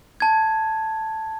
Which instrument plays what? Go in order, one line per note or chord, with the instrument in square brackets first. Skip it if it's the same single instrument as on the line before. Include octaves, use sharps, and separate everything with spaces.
[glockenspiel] A5 G#6